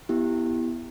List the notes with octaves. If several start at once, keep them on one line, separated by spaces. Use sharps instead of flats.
B3 E4 G4